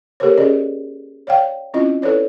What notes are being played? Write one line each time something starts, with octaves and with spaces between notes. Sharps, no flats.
A#3 G4 A4 A#4 C5 C#5
C#4 G#4 D5 D#5
C#5 D5 F5 G5
C4 C#4 E4 F4 D#5
E4 A4 B4 C#5 D5